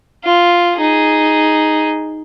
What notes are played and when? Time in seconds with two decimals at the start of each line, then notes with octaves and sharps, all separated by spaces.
0.24 F4
0.78 D#4 G#4